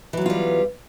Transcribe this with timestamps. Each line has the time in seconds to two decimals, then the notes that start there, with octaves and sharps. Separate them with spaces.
0.13 E3
0.17 F#3
0.21 B3
0.26 F4
0.30 G3